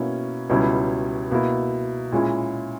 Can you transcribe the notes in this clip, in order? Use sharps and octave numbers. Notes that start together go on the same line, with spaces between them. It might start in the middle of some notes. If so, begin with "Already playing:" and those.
Already playing: B2 A#3 C#4 E4
C#2 B2 G3 C#4 E4
B2 A#3 E4
A#2 G#3 C#4 E4